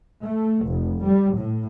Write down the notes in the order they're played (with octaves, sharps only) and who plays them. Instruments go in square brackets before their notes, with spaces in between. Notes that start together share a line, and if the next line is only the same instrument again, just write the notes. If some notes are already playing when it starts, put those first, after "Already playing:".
[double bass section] A3
F1
G3
A2